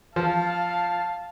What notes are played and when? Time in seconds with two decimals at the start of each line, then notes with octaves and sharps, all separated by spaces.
0.16 F3 F5 A5